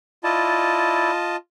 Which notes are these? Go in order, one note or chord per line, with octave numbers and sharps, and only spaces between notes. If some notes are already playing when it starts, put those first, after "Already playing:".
E4 F4 D5 D#5 A5